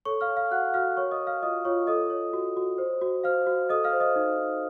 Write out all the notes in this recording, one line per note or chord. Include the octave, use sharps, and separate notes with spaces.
A4 C#5 C#6
F5 F6
C#5
F5 F6
F#4 F#5 F#6
F#4 F5 F6
A#4 C#5 C#6
D#5 D#6
C#5
F5 F6
F4 D#5 D#6
F4 C#5 C#6
A4 D#5 D#6
C#5
F#4
F#4
C5
F#4
C5 F5 F6
F#4
A4 D#5 D#6
F5 F6
C5
D#5 D#6
D#4
D#4